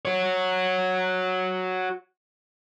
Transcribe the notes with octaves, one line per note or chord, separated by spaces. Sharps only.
F#4 C#5